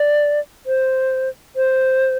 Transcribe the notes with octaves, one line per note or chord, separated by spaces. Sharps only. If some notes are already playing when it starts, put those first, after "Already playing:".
Already playing: D5
C5
C5